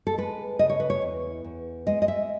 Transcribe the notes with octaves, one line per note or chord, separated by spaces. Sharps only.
A4
G#3 B4
C#3 D#5
C#5
B4
C#5
E2
E2
G#3 D#5
D#5
E5